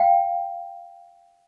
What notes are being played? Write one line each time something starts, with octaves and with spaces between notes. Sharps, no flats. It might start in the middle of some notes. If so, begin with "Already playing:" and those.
Already playing: F5 G5